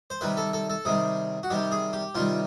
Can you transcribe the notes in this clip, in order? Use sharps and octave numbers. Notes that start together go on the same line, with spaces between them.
C5
C3 D#3 G3 B4
A4
A4
A4
C3 D#3 G3 G#4
F#4
C3 D#3 G3 G4
G#4
G4
C3 D#3 G3 F4